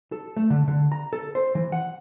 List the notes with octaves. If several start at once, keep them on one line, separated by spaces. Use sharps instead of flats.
A4
A3
D3
D3
A#5
A4
C5
E3
F#5